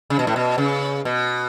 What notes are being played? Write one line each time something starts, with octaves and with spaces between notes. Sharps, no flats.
C#3
B2
A2
B2
C#3
B2